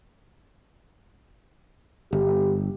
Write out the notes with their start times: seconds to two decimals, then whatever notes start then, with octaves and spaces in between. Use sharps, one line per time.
2.13 G1 G4